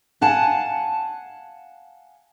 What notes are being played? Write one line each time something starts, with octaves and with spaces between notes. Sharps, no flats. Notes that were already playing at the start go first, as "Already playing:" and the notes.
F5 F#5 G#5 A5